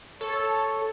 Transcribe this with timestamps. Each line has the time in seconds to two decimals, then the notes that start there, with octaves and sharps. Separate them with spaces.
0.21 A4 C#5